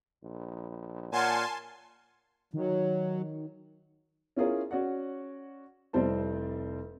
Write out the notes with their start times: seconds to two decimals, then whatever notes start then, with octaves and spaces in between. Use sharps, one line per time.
0.23 A#1
1.12 A#2 C#5 F#5 G#5 A5 C6 F6
2.54 D#3 F#3
4.36 C#4 E4 F4 G#4 A#4 C#5
4.71 C#4 F#4 D5 F#5
5.93 F1 G3 C4 E4 C5 A5